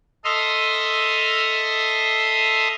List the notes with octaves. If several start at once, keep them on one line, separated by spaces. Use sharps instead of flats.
A4 D#5 E5 C6 D#6 F6